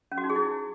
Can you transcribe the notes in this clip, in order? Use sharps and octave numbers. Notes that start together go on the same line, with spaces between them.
C#4
F#4
D#4
G#4
E4